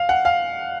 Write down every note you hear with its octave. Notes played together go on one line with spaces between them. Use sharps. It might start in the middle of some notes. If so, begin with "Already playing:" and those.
Already playing: F5
F#5
F5